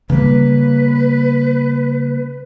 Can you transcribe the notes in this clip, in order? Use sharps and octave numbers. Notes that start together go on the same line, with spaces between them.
C#3 G3 A#3 B4